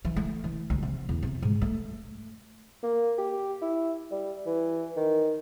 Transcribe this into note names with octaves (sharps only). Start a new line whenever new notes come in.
E3
A3
E3
D2
C3
E2
C3
G#2
A3
A#3
G4
E4
G3
E3
D#3